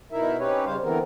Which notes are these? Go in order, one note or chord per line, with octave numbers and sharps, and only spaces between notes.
B2 D#4 E4 A#4 E5
C4 C#4 D#4 G4 B4 C#5
C#3 G3 C5 F5
D3 E3 B3 C4 A#4